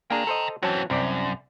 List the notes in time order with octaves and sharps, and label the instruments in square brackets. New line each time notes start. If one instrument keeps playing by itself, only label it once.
[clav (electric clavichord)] A#3 D4 G#4 [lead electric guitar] G5 A#5
[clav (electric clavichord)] A4 C5 D#5
[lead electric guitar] E3 C4 [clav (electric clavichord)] F#3 C#4 A5
[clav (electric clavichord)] C2 C4 D5 [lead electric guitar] F#2